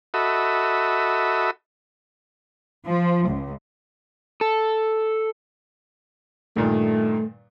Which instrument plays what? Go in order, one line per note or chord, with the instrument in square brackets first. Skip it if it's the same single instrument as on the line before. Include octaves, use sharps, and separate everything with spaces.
[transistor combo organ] F#4 A4 D#5 E5 B5
[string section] F3
C#2
[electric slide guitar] A4
[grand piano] G2 A#2 D#3 [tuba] A3